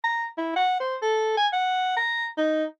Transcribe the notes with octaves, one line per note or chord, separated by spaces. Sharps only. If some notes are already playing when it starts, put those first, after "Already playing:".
A#5
E4
F#5
C5
A4
G#5
F#5
A#5
D#4